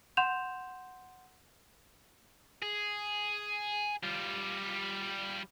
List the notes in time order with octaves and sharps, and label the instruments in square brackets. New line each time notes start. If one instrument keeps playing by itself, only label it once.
[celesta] F#5 C6 G6 E7 F7
[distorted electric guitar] G#4
G3 F4